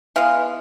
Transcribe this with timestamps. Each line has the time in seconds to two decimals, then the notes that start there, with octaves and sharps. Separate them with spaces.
0.16 E3 G#3 B3 F5